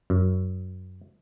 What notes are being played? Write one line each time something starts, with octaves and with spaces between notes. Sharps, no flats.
F#2